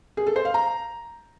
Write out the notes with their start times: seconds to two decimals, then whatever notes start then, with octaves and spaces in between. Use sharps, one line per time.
0.17 G#4
0.27 A4
0.36 C5
0.45 F5
0.54 A#5